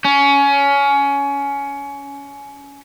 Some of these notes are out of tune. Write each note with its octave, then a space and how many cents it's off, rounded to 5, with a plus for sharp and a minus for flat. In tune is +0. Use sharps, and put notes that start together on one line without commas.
C#4 +20